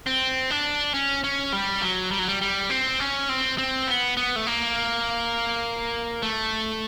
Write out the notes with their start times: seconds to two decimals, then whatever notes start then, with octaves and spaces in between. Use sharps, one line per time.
0.07 C4
0.50 D4
0.94 C#4
1.24 C#4
1.53 G3
1.82 F#3
2.11 G3
2.19 F#3
2.28 G3
2.42 G3
2.70 C4
3.00 C#4
3.29 C4
3.58 C4
3.87 B3
4.17 B3
4.36 A3
4.47 A#3
6.23 A3